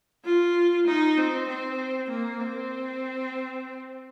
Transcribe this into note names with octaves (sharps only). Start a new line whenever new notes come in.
F4
D#4
C4
C4
A#3
C4